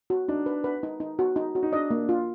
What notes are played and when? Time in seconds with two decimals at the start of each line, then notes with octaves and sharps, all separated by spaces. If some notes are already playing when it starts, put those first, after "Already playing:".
0.10 F#4
0.29 D4 D#4
0.46 B4
0.64 B4
0.83 D#4
1.00 D#4
1.19 F#4
1.36 D#4
1.55 F#4
1.63 D#4
1.72 D4 D#5
1.91 A#3
2.09 F4